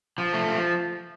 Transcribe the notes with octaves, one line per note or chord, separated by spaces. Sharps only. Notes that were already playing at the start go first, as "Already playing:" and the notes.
F3
A3
F3